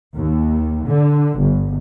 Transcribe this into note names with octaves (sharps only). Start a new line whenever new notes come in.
D#2
D3
G1